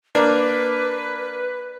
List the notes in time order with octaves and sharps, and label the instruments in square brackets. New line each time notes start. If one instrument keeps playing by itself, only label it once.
[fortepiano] A#3 D4 [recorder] B4